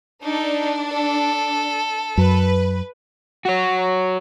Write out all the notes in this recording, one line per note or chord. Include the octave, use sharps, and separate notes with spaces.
D4 D#4 A4
A4
F#2 B4
F#4 C#5